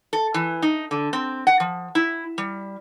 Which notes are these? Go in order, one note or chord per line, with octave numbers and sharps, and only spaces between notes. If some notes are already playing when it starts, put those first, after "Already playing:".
A4
E3
D#4
D3
C4
F#5
F3
E4
G3